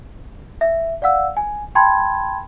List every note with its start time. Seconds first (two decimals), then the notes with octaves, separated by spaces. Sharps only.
0.61 E5
1.02 D5 F5 F#5 E6
1.37 G#5
1.75 G5 A5 B5 C6 G#6